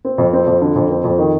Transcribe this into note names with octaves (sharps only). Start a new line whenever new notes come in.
C4
F2
C4
F2
D3
F2
C4
F2
D#3